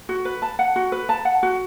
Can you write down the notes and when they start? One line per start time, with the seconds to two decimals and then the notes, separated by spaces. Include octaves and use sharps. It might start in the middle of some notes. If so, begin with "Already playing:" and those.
0.09 F#4
0.25 B4
0.42 A5
0.59 F#5
0.76 F#4
0.92 B4
1.09 A5
1.25 F#5
1.43 F#4